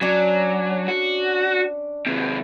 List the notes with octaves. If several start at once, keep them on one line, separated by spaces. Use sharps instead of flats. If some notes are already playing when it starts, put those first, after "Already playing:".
F#3 C#4 D4
F#4
D#2 C3